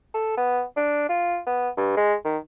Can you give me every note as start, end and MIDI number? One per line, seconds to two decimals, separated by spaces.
0.14 0.33 69
0.37 0.63 59
0.76 1.05 62
1.09 1.39 65
1.46 1.69 59
1.77 1.95 43
1.96 2.14 56
2.25 2.38 51